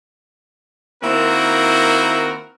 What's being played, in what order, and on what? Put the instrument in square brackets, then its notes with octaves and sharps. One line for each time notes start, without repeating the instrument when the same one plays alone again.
[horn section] D#3 A#3 C4 E4 F#4 A#4